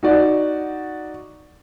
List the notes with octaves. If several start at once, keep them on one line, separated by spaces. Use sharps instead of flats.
D#4 F#4 D5